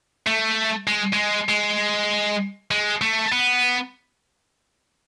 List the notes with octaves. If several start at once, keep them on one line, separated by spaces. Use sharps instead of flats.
A3
G#3
G#3
G#3
G#3
A3
B3